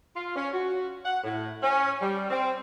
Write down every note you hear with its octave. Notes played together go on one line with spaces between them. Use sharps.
F4
C#4
F#4
F#5
A2
C#4
G3
C4